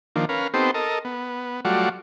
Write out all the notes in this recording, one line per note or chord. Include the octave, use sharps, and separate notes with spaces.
D#3 F3 A#3 D4
C#4 A#4 B4 F5
B3 C4 D#4 G4 A4 C5
A4 A#4 D#5
B3
F#3 G3 A3 F4 F#4 D5